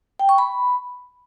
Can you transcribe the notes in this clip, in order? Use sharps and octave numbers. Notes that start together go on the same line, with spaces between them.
G5
C#6
B5